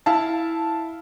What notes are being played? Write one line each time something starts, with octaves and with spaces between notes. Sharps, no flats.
E4 F5 A5